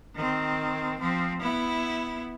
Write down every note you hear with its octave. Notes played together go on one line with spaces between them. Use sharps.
D#3 C4
F3 C4
B3 E4